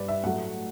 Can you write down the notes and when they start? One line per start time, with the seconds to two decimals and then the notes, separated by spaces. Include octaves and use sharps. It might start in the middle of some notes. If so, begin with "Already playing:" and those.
Already playing: G2 G3 B4 D5
0.08 E5
0.23 A2 F#3 A3 F#5